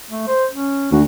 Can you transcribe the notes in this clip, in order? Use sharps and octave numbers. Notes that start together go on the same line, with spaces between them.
A3
C5
C#4
D2 F#4